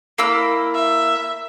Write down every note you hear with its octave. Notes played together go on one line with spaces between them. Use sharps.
A#3 E4 E6
E5